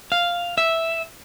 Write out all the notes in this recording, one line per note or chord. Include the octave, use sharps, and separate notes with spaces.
F5
E5